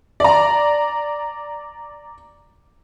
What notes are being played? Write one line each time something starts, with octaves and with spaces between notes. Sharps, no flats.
D5 A#5